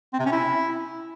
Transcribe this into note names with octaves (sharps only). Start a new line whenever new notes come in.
C4
C3
C#4
E4